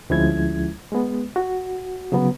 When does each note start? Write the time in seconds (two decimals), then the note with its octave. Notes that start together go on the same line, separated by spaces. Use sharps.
0.10 D2 F3 G#3 C#4 E4 G#6
0.92 G#3 B3
1.36 F#4
2.12 C#3 F#3 B3